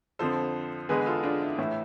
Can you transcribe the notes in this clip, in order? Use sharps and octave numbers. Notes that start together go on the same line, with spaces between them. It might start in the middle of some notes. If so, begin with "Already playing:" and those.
F2 D3 F3 A4 C5
E2 D3 G#3 G#4 B4
F4 A4
D4 F4
E4
A2 E3 A3 E4